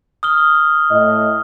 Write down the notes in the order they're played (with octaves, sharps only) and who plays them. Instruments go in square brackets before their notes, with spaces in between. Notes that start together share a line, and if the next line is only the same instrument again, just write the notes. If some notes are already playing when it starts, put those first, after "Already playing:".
[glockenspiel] D#6 F6 G7
[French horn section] A2 D#5